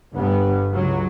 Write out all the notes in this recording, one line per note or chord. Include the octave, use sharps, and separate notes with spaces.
G1 G2 B3
C#2 F#3